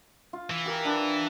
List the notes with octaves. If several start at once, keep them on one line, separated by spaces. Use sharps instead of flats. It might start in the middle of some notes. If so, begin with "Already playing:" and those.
F4
E3
G4 A#4
D4 B4